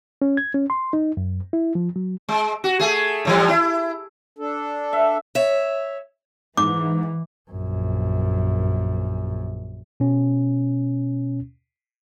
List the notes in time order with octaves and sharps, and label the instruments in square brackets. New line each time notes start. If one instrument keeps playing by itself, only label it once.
[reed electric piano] C#4
G#6
C#4
C6
D#4
F#2
E4
F3
F#3
[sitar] G#3
F#4
A3 G#4
A2 E3 G3
E4
[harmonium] D4 A4
[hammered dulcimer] E5
[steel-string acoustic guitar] C#5 E5
[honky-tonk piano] G#2 [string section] E3 [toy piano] D6
[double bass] A#1 F#2
[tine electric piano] B2 C#4